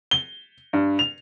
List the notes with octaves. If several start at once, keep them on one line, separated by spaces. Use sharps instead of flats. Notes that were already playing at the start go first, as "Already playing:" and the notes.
G7
G2
F7